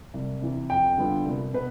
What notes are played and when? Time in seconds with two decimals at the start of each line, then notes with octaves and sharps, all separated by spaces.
0.14 C2
0.41 C3 E3
0.70 F2 G5
0.98 D3 G3 B3 F4
1.26 C2
1.54 B2 B4